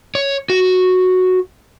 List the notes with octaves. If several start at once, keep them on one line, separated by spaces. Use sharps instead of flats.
C#5
F#4